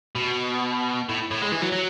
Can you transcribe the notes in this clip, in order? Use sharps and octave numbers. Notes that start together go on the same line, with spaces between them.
B2
A2
A2
G#3
E3
F#3
F#3